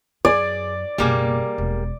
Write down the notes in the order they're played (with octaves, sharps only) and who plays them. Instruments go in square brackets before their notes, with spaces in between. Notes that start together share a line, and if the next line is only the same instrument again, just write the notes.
[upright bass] F#2 [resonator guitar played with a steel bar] G#4 [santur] D5
[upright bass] F#1 B2 [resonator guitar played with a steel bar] G3 A#3 G#4
[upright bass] E1